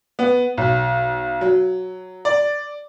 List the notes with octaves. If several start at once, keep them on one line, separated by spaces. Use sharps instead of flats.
B3
B1
F#3
D5